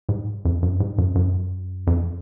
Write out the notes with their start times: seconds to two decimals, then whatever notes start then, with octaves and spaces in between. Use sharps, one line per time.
0.09 G#2
0.45 F2
0.63 F#2
0.80 G#2
0.98 F#2
1.15 F#2
1.87 F2